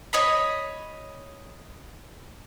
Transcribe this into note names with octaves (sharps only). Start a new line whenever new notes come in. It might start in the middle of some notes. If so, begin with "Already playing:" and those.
C#5 D#5 B5